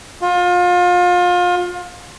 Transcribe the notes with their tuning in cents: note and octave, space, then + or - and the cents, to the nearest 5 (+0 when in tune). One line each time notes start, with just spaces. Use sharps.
F4 +30